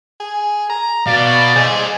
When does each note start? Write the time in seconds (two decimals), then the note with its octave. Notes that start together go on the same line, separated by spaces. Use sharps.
0.20 G#4
0.70 A#5
1.07 B2 D5 F5
1.56 G#4 C5 D#5